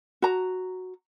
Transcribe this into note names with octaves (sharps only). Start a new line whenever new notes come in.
F#4 A#5